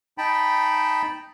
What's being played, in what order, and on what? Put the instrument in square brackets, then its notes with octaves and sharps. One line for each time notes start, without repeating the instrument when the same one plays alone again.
[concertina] D#4 G5 A5 B5